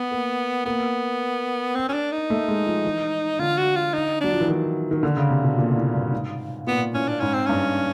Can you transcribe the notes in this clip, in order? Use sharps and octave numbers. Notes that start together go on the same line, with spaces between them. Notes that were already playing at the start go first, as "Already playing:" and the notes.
Already playing: B3
A#3
A#3 B3
C4
C#4
D4
D#4
A3
G#3
F3
E3
D3 F4
F#4
F4
D#4
F#3 D4
F3
E3
D#3
D#3
D3
C#3
C3
B2
A#2
A2
G2
G#2
A#2 B3
A2 C#4
D4
G#2 C#4
C4
G2 C#4